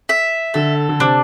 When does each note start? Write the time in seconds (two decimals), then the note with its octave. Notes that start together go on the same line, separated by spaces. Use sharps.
0.09 E5
0.54 D3 A4
0.89 D3
1.00 C3 D4